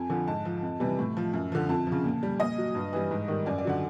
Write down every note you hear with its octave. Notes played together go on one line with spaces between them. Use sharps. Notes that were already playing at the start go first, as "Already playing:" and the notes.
Already playing: F2 G#5
D3 F3
G#2 A5
F3
F2
C3 E3 G3
A2
F3
F#2
D3 F3
F2 A5
F3
C#3
A#2
G3
A#2 D#5
F#3
G2
E3 G3
G#2
D#3 G3
F#2 D5
D5
D3 F#3 F#5